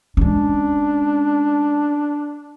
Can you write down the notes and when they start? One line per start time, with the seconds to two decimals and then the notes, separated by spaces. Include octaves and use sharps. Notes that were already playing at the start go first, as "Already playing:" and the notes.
0.17 G#3 C#4 D4